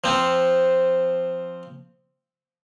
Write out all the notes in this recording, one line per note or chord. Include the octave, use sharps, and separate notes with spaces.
F3 C4